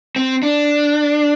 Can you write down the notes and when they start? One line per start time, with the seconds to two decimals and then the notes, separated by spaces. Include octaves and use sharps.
0.16 C4
0.43 D4